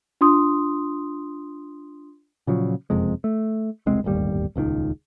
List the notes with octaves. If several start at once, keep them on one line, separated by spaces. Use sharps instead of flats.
D4 F4 C6 D#6
A#2 C#3 F3 F#3
F#1 F2 C3 G#3
A3
E1 C2 G#3 C4
D1 G1 D#2 G3
D#1 C#2 A2 D#3